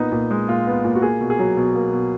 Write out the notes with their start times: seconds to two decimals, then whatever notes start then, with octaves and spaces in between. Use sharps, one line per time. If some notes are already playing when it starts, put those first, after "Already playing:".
Already playing: A#2 B3 D#4
0.12 A#2
0.31 G#3
0.48 A#2 F4
0.67 B3
0.84 A#2
0.95 F#4
1.02 A#3 G#4
1.21 B2
1.30 G#4
1.39 F#3
1.57 B2
1.75 A#3
1.93 B2